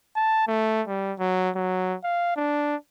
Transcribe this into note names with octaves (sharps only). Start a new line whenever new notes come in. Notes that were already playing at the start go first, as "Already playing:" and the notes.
A5
A3
G3
F#3
F#3
F5
D4